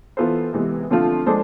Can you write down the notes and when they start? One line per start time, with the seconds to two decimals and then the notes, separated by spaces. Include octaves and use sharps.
0.17 E3 B3 F4 A4 C5
0.53 C3 E3 G#3 B3
0.90 D3 F3 A3 C4 F4
1.26 F3 G#3 D4 A4 C5